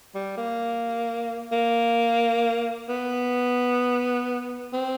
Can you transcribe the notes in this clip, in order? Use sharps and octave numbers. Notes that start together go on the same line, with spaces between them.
G3
A#3
A#3
B3
C4